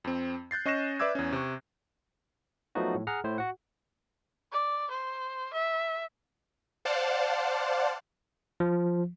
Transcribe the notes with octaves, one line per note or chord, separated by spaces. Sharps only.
F2 C4
F#6 G6 A6 C7
C#4 D#5 C#6 F#6 A#6 E7
B4 D5 E5 D6 E6 G#6
E2 C#4
C3 C#6
F3 F#3 A3 B3 D#4 F#4
A2
G#4 F#5 A#5 F6
A2 E4 C5
F#4 F#5
D5
C5
E5
C5 D5 F5 F#5 A5
F3